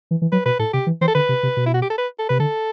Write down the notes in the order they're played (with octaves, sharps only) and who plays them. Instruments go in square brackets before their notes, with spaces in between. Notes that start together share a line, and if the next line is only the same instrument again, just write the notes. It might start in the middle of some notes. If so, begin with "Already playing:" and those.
[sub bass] E3
E3
[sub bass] F#3 [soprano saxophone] B4
[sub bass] B2 [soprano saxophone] B4
[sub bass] A2 [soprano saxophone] A4
[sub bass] C3 [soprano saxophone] G4
[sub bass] E3
[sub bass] E3 [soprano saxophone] C5
[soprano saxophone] A4
[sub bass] D3 [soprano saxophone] B4
[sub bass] C3
C3
B2
[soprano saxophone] E4
F#4
G4
A4
B4
A4
[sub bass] C3 [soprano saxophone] B4
[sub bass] D3 [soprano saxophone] A4